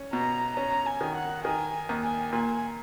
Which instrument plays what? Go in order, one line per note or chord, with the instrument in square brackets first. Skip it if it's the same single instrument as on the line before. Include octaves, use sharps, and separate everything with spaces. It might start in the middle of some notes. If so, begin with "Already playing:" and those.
Already playing: [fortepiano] C#4
[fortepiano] B2 [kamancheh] A#5
[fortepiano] C#4 [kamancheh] A#5
[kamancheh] G#5
[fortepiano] D#3
[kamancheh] F#5
[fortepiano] D#3 [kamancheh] G#5
[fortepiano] D#2
[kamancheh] G#5
[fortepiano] A#2 [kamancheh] G#5